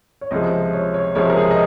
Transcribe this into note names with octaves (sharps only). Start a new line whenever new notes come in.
C#5
C#2 C3 F3 G#3 D#5
C#5
C#5
C#2 C3 F3 G#3 C#5
A#4
G#4
D#5